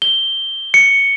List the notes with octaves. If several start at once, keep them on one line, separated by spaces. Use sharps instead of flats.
G7
C#7